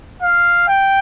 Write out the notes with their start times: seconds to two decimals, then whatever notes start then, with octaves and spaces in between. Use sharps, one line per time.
0.22 F5
0.68 G5